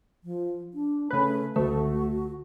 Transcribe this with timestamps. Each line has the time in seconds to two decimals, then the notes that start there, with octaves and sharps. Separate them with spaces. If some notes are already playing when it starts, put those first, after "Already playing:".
0.24 F3
0.74 D4
1.10 C#3 A3 B4
1.56 C#2 D3 A3 F#4